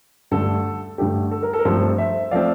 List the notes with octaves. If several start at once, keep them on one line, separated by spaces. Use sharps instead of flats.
G2 D3 A3 A4
G2 D3 A3 G4
A4
A#4
A4
A#4
G2 F3 A3 C4 A4 C5
C5 E5
F3 A3 C4 D5 F5